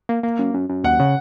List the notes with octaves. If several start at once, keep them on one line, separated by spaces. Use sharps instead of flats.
A#3
A#3
F#2
F#2
F#2
D#2 F#5
C#3